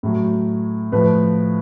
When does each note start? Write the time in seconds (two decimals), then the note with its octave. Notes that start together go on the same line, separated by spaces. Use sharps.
0.03 A2 F#3
0.92 A2 F3 B4